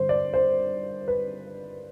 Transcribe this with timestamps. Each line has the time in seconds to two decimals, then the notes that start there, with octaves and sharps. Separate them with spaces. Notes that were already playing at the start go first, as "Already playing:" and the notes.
Already playing: G2 D3 C5
0.09 D5
0.34 C5
1.08 B4